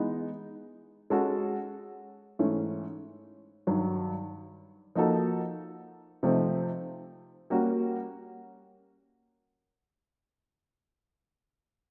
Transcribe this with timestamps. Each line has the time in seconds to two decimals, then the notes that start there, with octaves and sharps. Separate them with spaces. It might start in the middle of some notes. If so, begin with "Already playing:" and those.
Already playing: E3 G#3 B3 D#4
1.10 G#3 C#4 F#4 A4
2.39 G#2 E3 A3 C#4
3.67 G2 D#3 F#3
4.95 F3 A#3 D#4 F#4 A4
6.23 C3 F3 A3 C4 D#4
7.50 G3 A#3 C#4 F#4